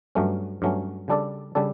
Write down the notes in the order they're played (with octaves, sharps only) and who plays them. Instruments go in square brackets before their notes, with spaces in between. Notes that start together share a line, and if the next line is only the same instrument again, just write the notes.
[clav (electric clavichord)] G2 F#3 A3 C#4
G2 F#3 A3 C#4
C#3 G3 D4 A4 D5
C#3 G3 D4 A4 D5